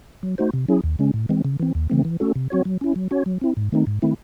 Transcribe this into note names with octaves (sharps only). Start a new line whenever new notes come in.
F#3
A3 D#4 F#4 C5
C3
F#3 C#4 E4 G#4
D#2
C#3 G#3 C#4
A2
E3 G#3 C4
C#3
E3 C4
D#2
C#3 E3 A3 C4
E3
A3 C#4 F#4 A4
C3
F#3 C4 F#4 C#5
F#3
C#4 E4
F#3
C#4 F#4 C#5
F#3
C4 E4
G#2
D#3 A3 C4 D#4
G#2
D#3 A3 C4 E4